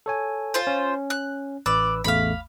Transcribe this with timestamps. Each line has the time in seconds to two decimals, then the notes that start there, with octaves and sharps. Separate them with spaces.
0.06 A4 C#5 G#5
0.54 F4 C5
0.67 C#4
1.10 F#6
1.66 A1 B4 D5 E6
2.04 A1 E2 A3 F5 B5